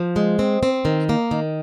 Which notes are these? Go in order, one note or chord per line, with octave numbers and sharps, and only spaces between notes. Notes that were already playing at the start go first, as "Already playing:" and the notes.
Already playing: F3 C5
G#3
C4
C4
D#3
A#3
D#3